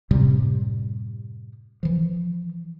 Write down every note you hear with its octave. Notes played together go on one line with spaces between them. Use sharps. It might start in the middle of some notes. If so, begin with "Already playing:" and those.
F#2 A2 C3 G3
E3 F3